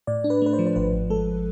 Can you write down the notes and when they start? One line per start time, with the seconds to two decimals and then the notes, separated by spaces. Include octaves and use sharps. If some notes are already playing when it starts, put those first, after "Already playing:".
0.07 A2 D5
0.24 D4
0.30 B4
0.42 A3 B4
0.53 C5
0.59 F3
0.67 C5
0.76 G#1 B4
0.93 G#1
1.10 G#3 A4